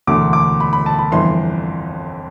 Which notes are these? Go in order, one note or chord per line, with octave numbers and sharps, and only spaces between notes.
E1 D2 D3 A3 D6
D6
B5
B5
A5
B5
G1 F2 E3 C6